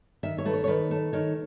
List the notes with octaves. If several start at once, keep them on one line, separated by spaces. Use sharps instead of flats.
D#3 E5
C#5
A3 B4
C#5
C#5
D#3 B4
A3
D#3 C#5